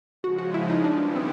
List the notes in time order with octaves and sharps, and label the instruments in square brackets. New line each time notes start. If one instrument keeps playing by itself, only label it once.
[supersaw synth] C#3 F3 G#3 [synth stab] F#4
[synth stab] F#4
E4
D#4
[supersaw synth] D#3 G3 B3 E4 [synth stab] D4
[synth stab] C4